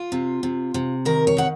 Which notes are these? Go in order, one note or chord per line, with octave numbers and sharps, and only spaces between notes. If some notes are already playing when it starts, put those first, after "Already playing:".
Already playing: F4
C3
C3
C3
D#3 A#4
C#5
D#3 F#5